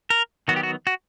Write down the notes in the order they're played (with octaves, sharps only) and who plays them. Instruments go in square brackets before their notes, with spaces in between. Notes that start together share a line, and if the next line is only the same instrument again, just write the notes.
[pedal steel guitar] A#4
D#3 F#3 B3 F#4
G4
F#4
F#4